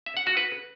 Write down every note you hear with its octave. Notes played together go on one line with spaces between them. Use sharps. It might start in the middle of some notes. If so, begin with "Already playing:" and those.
E5
F#5
F#4
B4